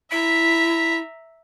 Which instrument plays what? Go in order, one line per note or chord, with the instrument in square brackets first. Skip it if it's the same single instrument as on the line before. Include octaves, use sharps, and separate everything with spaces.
[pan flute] E4 [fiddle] E5 A#5 [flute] B6